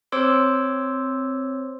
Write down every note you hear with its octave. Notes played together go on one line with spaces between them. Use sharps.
C4 C5 C#5 C6 D6 E6